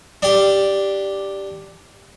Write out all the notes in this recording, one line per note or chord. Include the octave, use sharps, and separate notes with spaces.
D4 G4